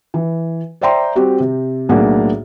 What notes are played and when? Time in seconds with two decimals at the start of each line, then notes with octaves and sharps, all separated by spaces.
0.14 E3
0.81 C5 D5 E5 G5 A#5 C6
1.15 G3 C4 F#4 G4
1.40 C3
1.89 B1 A2 A#3 D4 G#4 F#5